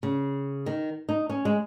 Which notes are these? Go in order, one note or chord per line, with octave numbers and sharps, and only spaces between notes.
C#3
D#3
D#4
C#4
G#3